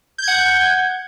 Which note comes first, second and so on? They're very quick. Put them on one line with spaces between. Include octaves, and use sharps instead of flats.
G6 G#6 F#5